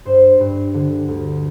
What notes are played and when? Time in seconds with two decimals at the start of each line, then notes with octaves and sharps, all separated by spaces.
0.05 G2 C5
0.40 G2
0.74 D3
1.08 D2